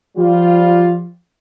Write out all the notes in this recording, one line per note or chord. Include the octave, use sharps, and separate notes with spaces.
F3 G3 F4